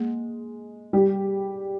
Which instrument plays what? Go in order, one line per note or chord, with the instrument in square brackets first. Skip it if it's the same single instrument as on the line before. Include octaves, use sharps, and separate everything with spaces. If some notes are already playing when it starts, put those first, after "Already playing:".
Already playing: [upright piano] G#3 [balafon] A#3
[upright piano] G3 G4